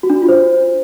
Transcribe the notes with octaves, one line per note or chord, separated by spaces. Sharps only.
F#4
D4
F#4
F4
C5